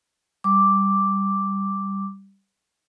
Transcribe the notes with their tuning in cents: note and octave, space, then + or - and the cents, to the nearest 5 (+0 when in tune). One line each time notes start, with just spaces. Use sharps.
G3 +0 D6 +0